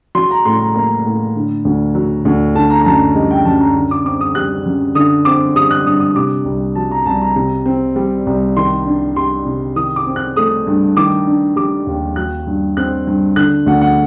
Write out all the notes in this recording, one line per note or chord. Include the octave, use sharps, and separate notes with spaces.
F#3 C6
A#5
A2 C6
A#5
A#3 A#5
A2
D3
D2
F#3
D2
D3 A5
A#5
A#5
F#2 A5
G3 D#5
G5
F#2 A5
A#5
D3
D6
C4 D6
D#6
G3 F#6
F#2
D3 D#6
C4 D6
G3 D#6
F#6
G2 D#6
D#6
C3 D6
C2
F#3 A5
A#5
C2 A5
A#5
C3
C4
G3
C2
D#3 C6
D4
G3 C6
C3
D#3 D#6
D6
C4
F#6
A3 D#6
G2
D#3 D6
D4
G3 D6
D#2
F#3 F#6
G2
C4 F#6
G2
D3 F#6
D2 F#5
F#5